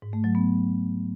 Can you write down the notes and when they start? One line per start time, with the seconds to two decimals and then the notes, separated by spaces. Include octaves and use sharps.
0.02 G#2
0.13 A3
0.24 F#3
0.35 B3